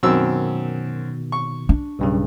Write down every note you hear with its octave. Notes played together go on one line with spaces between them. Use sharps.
F#2 B2 D#3 C4 E6
C#6
D4
B1 G2 C#3